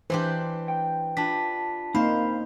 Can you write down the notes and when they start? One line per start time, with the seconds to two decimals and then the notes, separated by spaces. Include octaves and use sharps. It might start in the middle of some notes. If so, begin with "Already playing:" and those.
0.10 E3 D4 G4 C5
0.68 G5
1.17 D4 F4 A5 B6
1.95 A#3 C4 D#4 C5 F5 B5